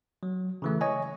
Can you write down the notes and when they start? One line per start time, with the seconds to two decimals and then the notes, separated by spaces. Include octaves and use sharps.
0.23 F#3
0.62 C#3 E3 A3
0.81 C#5 D#5 G#5